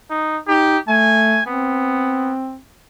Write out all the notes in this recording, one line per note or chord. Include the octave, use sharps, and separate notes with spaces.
D#4
D#4 G4
A3 G#5
B3 C4